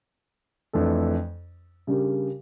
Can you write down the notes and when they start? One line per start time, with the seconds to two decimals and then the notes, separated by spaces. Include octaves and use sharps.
0.73 F2 E3 A3 D4 A4
1.87 C#3 G3 D4 G4 A#4